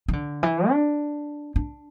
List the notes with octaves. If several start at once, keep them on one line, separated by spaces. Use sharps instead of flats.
E3
D3
E3
D4
D4